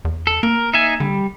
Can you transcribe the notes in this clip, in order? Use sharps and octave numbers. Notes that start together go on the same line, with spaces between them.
E2
A4
A#3 A#4
D#4 E5 G#5
D3 G3